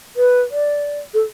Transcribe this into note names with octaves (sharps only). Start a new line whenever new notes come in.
B4
D5
A4